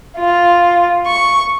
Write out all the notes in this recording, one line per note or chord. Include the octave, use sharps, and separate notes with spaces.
F4
C#6